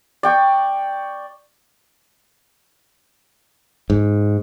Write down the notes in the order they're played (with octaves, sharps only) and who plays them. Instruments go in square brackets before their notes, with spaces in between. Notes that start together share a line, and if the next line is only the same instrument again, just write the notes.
[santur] D5 G5 C#6
[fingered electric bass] G#2